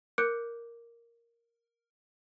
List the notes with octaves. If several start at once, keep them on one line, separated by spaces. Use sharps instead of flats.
A#4 D6 F#6 G6 C#7 D7